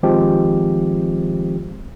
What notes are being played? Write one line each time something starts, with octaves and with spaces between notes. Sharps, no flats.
D#3 F3 G#3 C4 G4